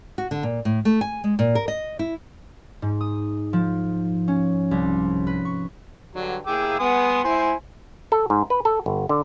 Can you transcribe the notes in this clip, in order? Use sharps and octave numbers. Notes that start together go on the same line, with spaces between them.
F#4
D3
A#2
A2
A3
G#5
G#3
A#2
A#4
D#5
E4
G#2
D#6
F3
C#4
C2
B4
C#6
G2 D3 F#3
A#3 E4 G#4 G5 D6 E6
B3 G#5 C6 D#6
E4 C5 G#5 C6
A4
G#2
B4
A4
G1
D3